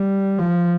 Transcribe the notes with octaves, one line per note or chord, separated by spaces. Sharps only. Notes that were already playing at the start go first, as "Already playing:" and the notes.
Already playing: G3
F3